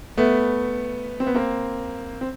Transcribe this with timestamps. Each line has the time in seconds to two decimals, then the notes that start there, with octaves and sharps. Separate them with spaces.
0.17 A3 B3
1.20 C4
1.27 B3
1.34 A#3 C4
2.21 C4